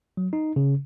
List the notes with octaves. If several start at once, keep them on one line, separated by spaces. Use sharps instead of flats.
F#3
D#4
C#3